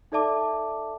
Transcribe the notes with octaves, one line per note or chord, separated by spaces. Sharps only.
D#4 A4 D5 E5 A5 D6